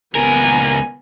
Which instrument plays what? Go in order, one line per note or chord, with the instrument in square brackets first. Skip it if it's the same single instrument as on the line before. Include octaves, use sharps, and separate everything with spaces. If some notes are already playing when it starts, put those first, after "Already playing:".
[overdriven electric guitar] C#2 A#4 [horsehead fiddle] B3 G#5